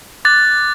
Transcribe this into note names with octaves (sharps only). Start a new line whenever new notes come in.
D6 F#6 A6